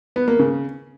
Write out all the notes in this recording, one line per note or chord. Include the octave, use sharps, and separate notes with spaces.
B3
A#3
C#3